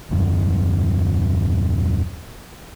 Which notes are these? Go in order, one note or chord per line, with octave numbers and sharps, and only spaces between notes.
D#1 F#2